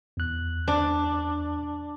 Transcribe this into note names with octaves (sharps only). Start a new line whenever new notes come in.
E2 F#6
D4